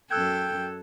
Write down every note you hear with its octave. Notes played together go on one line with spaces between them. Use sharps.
F#2 A4 G5 E6 F#6 G#6